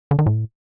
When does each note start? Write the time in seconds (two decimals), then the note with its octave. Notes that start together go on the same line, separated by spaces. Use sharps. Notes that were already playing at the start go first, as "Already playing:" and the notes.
0.11 D3
0.19 D#3
0.26 A2